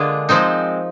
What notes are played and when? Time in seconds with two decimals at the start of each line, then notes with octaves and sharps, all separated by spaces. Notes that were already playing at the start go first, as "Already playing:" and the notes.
Already playing: D3 G#3 A#3 D4 F4 G#4
0.29 F3 G#3 C4 D#4